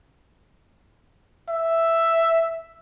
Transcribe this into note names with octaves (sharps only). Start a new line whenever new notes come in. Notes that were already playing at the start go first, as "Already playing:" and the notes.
E5